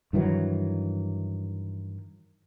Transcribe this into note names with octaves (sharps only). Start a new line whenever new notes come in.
G2 D#3 E3 F#3